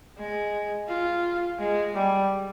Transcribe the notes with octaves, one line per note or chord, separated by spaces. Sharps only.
G#3
F4
G#3
G3